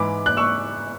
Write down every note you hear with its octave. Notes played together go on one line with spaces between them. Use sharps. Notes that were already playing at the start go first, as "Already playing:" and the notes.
Already playing: G#2 E3 B5 D6
F#6
C#6 E6